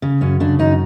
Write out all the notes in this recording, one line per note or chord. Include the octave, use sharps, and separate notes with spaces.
C#3
F#2 C#4
C#3 D4
F#2 D#4